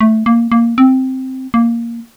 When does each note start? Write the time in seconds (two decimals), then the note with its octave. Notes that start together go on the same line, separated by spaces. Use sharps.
0.01 A3
0.26 A#3
0.52 A#3
0.78 C4
1.54 A#3